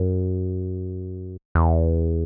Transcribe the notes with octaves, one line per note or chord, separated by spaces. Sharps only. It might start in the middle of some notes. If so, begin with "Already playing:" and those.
Already playing: F#2
E2